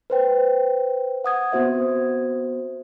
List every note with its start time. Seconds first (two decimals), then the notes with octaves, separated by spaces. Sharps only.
0.10 B4 C5 G5
1.24 F#5 D#6 G#6
1.52 B3 C4 F#4 C5 E5